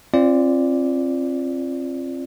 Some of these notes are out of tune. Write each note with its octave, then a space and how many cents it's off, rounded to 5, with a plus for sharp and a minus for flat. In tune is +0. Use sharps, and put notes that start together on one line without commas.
C4 +30 F4 -25 D5 +0